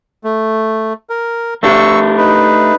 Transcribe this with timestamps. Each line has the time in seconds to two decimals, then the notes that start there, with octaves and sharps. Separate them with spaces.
0.24 A3
1.10 A#4
1.63 A3 D4 G4 C#6 E6
2.18 D#4 B4